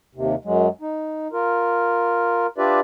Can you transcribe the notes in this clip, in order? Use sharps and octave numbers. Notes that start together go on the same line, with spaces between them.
D#2 C3
F#2 F#3 G#3
D#4
F4 A#4
D4 F4 G4 B4 D5 E5